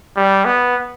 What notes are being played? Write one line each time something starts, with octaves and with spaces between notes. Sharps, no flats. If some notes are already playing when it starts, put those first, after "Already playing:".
G3
B3